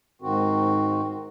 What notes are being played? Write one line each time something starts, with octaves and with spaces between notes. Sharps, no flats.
G#2 D#3 C4 F#4